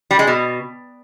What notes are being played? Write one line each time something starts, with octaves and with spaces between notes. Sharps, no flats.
G3
G#3
B2